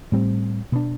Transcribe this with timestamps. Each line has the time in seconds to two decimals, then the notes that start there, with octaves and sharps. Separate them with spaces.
0.12 A2 G3 C4
0.72 B2 B3 D4